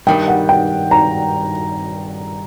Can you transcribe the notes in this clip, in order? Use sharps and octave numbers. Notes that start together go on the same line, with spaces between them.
G2 D#3 G3 G5
F#5
G5
A#5